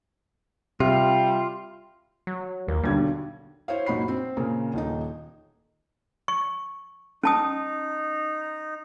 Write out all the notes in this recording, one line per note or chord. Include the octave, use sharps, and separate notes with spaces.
C3 G3 F4 E5
F#3
D#2 A#3
B1 D3 G3 G#6
E4 C5 C#5 F5
F#1 A#2 D#4 F#4 B5 C7
C4
A#2 C#3 A#3
D#1 D#3 D#4
C#6
C#4 D#4 A5 D#6